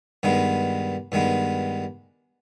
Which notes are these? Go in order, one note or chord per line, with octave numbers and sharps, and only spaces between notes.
G2 D#3 G#3 B3
G2 D#3 G#3 B3